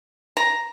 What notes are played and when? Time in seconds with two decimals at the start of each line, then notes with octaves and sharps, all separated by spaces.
0.37 A#5